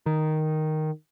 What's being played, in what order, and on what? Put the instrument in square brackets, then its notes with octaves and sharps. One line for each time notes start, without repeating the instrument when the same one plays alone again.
[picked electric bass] D#3